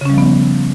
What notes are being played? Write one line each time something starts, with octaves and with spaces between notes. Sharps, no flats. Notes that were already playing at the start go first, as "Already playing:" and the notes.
C#3 F3 G3 B3 C#4